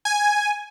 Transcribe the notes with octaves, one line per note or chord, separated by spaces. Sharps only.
G#5